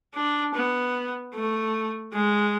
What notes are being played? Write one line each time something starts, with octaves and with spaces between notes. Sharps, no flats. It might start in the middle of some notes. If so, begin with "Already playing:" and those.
D4
B3
A3
G#3